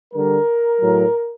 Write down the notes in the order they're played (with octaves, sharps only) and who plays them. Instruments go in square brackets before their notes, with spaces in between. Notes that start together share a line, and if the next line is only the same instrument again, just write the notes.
[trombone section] D3 G3 A#4
A2 F#3